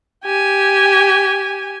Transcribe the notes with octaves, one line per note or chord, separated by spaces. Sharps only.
G4 G#5